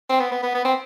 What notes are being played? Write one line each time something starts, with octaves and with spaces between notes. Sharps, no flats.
C4
B3
B3
B3
B3
C4